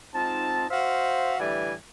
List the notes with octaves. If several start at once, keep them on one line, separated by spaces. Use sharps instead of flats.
G#2 C4 D#4 F4 A5
F#4 C5 E5 F5
A2 D3 E3 G3 D5 G#5